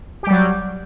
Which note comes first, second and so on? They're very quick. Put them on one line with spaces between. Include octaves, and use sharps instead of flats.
G4 G3 F#3